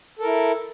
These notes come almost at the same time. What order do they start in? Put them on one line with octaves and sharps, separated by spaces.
A4 A#4 E4